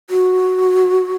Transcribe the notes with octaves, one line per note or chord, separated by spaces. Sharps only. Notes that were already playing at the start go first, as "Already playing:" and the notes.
F#4